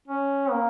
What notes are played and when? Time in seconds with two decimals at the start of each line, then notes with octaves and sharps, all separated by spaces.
0.08 C#4
0.51 A#3